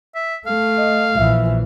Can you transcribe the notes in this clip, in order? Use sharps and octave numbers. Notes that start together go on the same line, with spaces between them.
E5
A3 F5
D#5
A#1 E3 E5